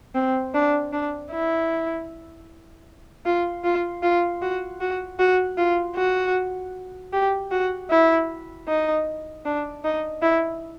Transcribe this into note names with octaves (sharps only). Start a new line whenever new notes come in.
C4
D4
D4
E4
F4
F4
F4
F#4
F#4
F#4
F4
F#4
G4
F#4
E4
D#4
D4
D#4
E4